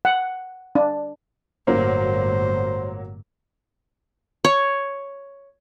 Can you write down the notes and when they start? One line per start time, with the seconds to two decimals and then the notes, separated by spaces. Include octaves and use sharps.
0.05 F#5
0.75 D4
1.67 G1 A2 F#3 A#3 C5
4.45 C#5